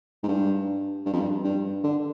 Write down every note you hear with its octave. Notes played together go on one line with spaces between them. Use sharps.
G#2
G2
G2
F2
G2
G2
D3